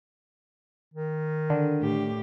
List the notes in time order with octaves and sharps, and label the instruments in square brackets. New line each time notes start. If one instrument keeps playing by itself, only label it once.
[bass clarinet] D#3
[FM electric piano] D3
[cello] A2 G4